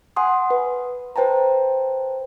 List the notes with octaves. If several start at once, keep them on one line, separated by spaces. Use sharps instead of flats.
F#5 G#5 C6 D#6
B4
B4 C5 G5 A5 A#5